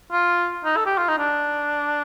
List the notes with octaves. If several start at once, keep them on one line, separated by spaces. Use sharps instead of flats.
F4
D#4
A4
G4
F4
D#4
D4